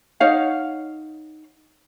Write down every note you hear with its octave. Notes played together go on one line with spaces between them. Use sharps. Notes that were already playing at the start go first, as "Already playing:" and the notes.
D#4 C#5 F5 F#5